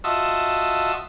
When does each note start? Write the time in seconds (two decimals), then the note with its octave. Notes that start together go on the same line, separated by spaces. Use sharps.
0.04 F4 F#4 D#5 E5 A5 E6